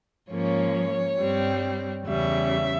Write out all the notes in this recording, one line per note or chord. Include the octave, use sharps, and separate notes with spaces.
G#2 F3 A#3 C#4 C#5
G2 G3 C4
E2 C#3 G3 C#4 E5